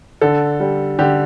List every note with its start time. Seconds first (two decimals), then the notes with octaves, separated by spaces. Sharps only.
0.21 D3 A4
0.60 G3
0.99 D3 G4